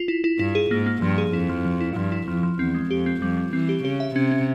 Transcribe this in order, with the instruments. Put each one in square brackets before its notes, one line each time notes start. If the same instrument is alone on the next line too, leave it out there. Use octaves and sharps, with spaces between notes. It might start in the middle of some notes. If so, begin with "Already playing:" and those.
Already playing: [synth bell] F4
E4
E4
[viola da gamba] G2 [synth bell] E4
[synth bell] G#4
[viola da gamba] G#2 [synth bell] A#3
[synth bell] A#3
[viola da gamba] G2 [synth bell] F3
[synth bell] G#4
[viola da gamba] F2 [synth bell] E4
[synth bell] F3
F3
E4
[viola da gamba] G2 [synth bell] F3
[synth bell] E4
[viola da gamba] F2 [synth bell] F3
[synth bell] F3
[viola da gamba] E2 [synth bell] C4
[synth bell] G#3
[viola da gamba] F2 [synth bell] G4
[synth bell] C4
[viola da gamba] F2 [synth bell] G3
[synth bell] G3
[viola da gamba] E3 [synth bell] C4
[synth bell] G4
[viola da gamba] C#3 [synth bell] G4
[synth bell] E5
[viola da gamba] C3 [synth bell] C#4
[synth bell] C#4